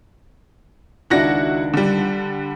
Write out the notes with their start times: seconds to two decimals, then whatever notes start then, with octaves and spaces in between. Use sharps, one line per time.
1.10 C#2 D#3 D4 E4 F#4 A#6
1.74 D3 G3